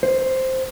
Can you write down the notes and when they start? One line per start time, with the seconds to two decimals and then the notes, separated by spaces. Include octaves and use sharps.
0.03 C5